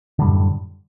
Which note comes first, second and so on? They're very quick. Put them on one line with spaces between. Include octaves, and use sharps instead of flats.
D3 G3 F#2 A2